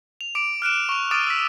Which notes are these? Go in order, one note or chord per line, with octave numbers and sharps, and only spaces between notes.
F7
D6 D7
F6 F#6 D7 E7
C#6 F7
D6 D#6 F6 A6 D7 D#7
E6 B6